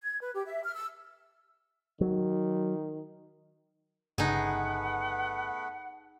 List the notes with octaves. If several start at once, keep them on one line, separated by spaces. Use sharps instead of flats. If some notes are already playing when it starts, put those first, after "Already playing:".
G#6
B4
G4
E5
F6
E6
D#3 F#3
G1 C#3 A3 B3 D#4 G#4 B4 F#5